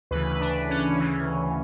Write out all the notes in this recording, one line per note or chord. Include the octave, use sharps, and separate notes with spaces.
D2 C#3 E3 B4
D4
C#4
D2 C#3 E3